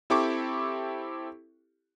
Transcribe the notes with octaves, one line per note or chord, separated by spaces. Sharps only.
C4 E4 G4 A4 C#6 D6